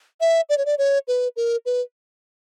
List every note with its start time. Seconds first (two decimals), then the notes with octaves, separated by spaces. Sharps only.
0.21 E5
0.49 D5
0.58 C#5
0.66 D5
0.78 C#5
1.08 B4
1.36 A#4
1.66 B4